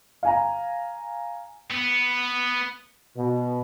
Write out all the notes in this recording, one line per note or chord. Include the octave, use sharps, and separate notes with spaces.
F5 G#5 A#5
B3
B2